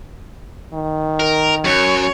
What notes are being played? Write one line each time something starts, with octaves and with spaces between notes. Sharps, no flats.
D#3
A#4
F#2 C#5